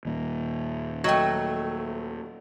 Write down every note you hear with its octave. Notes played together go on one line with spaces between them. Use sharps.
D#2 A#2
F#3 A3 D#5 G5